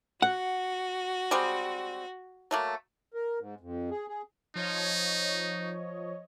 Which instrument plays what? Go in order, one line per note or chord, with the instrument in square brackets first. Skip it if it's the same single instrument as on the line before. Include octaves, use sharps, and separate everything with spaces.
[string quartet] F#4 [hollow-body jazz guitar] F#5
[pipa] G3 G#3 C4
F#3 A3 A#3
[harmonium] A#4
G#2
F2
G#4
G#4
[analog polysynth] F3 C#5 D#5 [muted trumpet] D#4